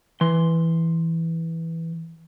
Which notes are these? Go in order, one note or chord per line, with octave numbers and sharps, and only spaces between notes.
E3 C6